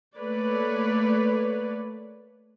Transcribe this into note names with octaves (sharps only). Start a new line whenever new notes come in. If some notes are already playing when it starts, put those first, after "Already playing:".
A3 A#3 B4 C#5 D5